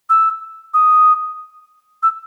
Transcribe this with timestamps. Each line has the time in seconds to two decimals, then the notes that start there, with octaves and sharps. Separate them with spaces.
0.10 E6
0.74 D#6
2.03 E6